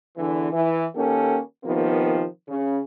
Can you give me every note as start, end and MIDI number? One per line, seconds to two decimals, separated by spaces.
0.17 0.51 40
0.17 0.51 50
0.17 0.51 52
0.53 0.86 52
0.96 1.39 51
0.96 1.39 58
0.96 1.39 61
0.96 1.39 67
0.96 1.39 69
1.64 2.24 48
1.64 2.24 51
1.64 2.24 53
1.64 2.24 58
1.64 2.24 59
2.49 2.78 49